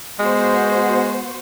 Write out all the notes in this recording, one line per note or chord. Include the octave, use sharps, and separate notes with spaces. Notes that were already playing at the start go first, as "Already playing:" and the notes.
G#3 B3 F#4 C5